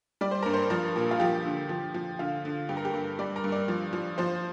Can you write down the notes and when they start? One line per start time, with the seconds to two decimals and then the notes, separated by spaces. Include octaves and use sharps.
0.21 G3 D5
0.31 C5
0.43 G2 A#4
0.54 C5
0.70 F3 A#4
0.96 A#2
1.11 F4
1.20 F3 G4
1.45 D3
1.69 F3
1.94 F3
2.19 D3 F4
2.45 D3
2.69 G2 G4
2.77 A#4
2.85 G4
2.94 G2
3.19 G3 D5
3.36 A#4
3.44 G2
3.52 D5
3.68 F3
3.93 F3
4.18 F3 C5